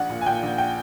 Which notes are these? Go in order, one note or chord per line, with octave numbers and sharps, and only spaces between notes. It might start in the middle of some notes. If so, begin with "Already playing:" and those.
Already playing: A#1 F#5
A#2
G#5
A#2 G5
A#1
G5